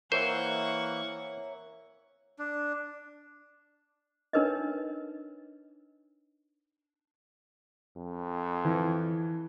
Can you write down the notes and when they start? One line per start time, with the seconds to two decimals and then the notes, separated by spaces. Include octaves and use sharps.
0.12 E3 A#3 A#4 C5 C#5 E5 F#5 C#6
2.39 D4
4.33 D4 D#4 A#4 B4 C#5 D#5
7.97 F2
8.65 E3